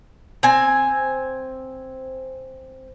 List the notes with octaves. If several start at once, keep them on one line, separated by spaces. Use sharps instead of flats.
C4 G#5